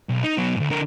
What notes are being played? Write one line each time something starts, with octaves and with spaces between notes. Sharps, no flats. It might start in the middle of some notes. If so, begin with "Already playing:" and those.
B1
D#4
F#3 B3
D2 G#2
D3 A#4